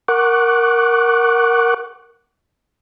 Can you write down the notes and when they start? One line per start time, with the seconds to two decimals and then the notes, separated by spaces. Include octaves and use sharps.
0.08 A#4 F#5 C#6 D6 F#6